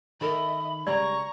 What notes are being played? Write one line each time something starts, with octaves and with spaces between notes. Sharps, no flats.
D#3 A4 A#4 D#5 E5 B5
C#3 G3 G#3 D5 A#5 C#6